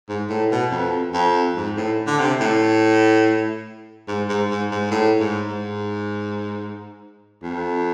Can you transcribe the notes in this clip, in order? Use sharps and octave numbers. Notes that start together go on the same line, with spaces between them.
G#2
A2
B2
F2
F2
G#2
A2
D3
C3
A2
G#2
G#2
G#2
G#2
A2
G#2
G#2
F2